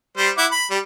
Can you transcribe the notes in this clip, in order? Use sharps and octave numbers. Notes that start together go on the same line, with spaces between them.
G3 C5
E4 F#5 D6
B5
G3